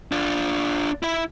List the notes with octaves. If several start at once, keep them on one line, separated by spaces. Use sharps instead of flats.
D4 F4
E4 E5